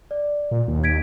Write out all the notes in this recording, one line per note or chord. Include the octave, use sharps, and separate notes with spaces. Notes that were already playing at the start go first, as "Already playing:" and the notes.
D5
A#2
D#2
G#6 B6 D7